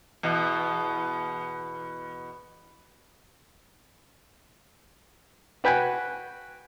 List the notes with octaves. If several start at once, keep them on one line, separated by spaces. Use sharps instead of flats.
E2 B2
F#4 B4 G5 G#5